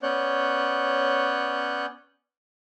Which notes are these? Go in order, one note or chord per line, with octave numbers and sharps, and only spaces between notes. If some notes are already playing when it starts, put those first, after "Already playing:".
B3 C#4 C#5 D5 F#6 G6